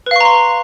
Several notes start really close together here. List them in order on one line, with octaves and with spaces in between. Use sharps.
B4 F5 C#6 A#5 C6